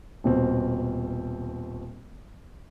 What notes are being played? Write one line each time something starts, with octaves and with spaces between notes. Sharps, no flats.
D#1 B2 C4